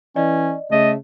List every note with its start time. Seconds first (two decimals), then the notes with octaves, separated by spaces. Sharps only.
0.16 E3 C#4 D5 D#5
0.71 C#3 A3 D#5